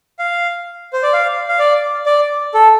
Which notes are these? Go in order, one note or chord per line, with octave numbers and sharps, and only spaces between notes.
F5
C5
D5
F5
F5
D5
D5
A4